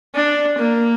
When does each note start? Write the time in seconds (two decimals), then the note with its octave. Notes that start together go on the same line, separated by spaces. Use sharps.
0.14 D4
0.58 A#3